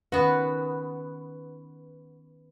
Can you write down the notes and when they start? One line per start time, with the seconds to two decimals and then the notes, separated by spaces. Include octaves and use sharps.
0.12 D#3 B3 C#4 F#4 B4